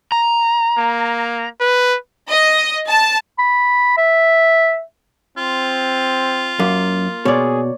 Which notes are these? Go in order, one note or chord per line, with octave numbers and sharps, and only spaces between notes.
A#5
A#3
B4
D#5
A5
B5
E5
C4 F4
F#2 A#3
B2 G#4 C#5 D5